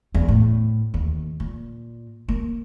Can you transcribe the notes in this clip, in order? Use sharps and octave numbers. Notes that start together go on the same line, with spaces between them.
E2
A2
D#2
A#2
A#3